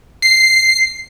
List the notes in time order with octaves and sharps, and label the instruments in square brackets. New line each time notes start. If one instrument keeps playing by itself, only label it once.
[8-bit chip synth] C7